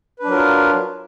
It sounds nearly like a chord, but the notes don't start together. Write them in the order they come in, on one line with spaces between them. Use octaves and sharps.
B4 D4 F#3 A#4 F4